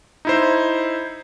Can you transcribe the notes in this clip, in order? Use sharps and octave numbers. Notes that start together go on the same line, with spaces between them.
D#4 E4 C5